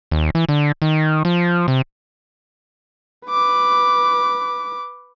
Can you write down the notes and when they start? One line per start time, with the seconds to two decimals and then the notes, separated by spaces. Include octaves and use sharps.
0.11 D#2
0.35 E3
0.49 D3
0.82 D#3
1.25 F3
1.68 C3
3.27 B4 D6